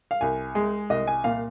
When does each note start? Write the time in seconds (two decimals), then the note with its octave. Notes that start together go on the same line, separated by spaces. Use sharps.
0.11 F5
0.21 C2 G#5
0.55 G#3
0.90 C2 D#5
1.07 G#5
1.24 A#2 F5